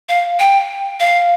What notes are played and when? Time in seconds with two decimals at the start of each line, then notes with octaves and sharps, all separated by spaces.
0.09 F5
0.39 G5
1.00 F5